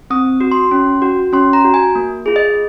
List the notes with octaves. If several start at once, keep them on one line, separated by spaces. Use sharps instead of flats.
C4 D#6
F#4
C6
C#4
F#4
C#4 C6
A#5
F#4
G#5
A#3
F4 G#4
D#5